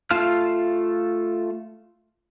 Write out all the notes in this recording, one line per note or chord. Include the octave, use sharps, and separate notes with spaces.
A3 F4 F5 A5 F6